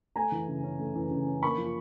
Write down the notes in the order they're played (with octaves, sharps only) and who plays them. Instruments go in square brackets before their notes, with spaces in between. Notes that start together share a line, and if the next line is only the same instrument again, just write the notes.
[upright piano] A3 G#5 A#5
E3
C#3
C#4
A3
E3
C#3
C#4
A#3 B5 C#6
F3